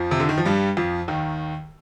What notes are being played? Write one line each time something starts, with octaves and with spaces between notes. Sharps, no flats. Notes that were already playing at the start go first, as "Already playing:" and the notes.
Already playing: F2 F3
C3
D3
D#3
F3
G2 G3
F2 F3
D#2 D#3